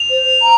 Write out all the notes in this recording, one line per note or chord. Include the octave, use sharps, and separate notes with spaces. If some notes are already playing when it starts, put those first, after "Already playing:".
Already playing: F7
C5
A#5